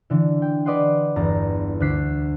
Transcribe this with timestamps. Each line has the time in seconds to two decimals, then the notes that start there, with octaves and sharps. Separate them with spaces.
0.10 D3 E3
0.42 G5
0.65 B4 D5 D#5 F#5 C6
1.16 G1 E2 A#5 A6
1.80 D2 D6 F#6 B6 C7